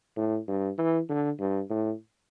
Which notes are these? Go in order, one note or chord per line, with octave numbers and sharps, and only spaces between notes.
A2
G2
E3
D3
G2
A2